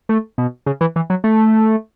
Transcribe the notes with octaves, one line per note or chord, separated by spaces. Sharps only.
A3
B2
C#3
E3
E3
F#3
A3